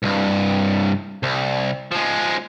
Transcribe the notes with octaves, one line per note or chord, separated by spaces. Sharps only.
C2 G2
C2
F3 G#3